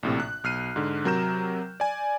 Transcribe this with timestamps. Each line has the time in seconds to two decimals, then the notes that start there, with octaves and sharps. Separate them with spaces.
0.03 A#1 A2 C3
0.20 F#6
0.44 B1 F6 C7 D#7
0.76 G#2 D3
1.05 C3 F#3 A#4 A#5 G6 E7
1.80 D5 G#5